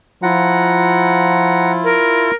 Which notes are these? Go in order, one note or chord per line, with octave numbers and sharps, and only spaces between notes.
F3 E4 F4 F#5 A#5
A#4